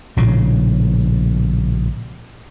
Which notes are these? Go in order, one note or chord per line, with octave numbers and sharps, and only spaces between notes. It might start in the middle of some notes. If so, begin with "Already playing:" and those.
A#1 A2 C#3